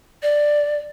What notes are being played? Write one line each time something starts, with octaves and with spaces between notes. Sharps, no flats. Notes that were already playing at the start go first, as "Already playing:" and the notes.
D5